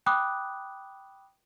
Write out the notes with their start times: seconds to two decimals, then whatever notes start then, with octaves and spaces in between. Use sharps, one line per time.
0.06 G5 B5 D6 D#6 F#6